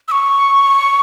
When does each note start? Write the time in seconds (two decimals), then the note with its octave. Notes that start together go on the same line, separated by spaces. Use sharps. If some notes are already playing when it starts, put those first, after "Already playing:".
0.08 E6
0.12 C#6